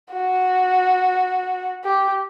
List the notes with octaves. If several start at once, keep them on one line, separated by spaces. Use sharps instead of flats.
F#4
G4